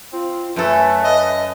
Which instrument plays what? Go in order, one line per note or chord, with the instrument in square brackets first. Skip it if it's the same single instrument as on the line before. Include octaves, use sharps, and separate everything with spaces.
[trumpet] C4 [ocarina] F4
[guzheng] F#2 A4 [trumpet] A3 [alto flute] B4 [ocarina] E5
[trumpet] D#5